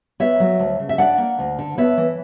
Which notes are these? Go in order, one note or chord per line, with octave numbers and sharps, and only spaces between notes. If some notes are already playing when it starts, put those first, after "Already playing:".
B3 C#5 E5
F#3
D2
C#3
E5
D4 D5 F#5
A#3
D2
D3
B3 C#5 E5
E3